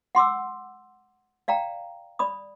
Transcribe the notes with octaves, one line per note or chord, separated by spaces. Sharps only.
F#5 C6 D6 E6
D5 F5 G5 A#5
D5 B5 D#6